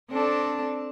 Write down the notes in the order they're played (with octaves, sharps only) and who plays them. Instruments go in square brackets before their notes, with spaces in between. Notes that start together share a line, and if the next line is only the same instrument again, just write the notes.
[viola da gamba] C4 D4 A4